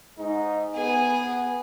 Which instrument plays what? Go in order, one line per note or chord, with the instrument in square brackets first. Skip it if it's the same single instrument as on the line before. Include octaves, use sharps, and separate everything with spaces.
[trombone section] G#2 D#4
[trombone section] B3 [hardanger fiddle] G#4